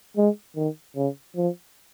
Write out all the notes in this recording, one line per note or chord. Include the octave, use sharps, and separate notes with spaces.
G#3
D#3
C#3
F3